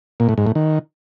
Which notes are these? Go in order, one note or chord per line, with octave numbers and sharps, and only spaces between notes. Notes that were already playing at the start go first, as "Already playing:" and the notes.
A#2
A2
G#2
A2
D#3